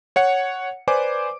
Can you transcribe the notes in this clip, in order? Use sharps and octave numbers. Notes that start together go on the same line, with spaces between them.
C#5 F#5 C#7
B4 C5 D5 G#5 D6